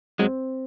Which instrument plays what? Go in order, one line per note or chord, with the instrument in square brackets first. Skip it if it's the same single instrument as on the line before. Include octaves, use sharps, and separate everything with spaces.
[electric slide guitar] F#3 G#3 [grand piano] C4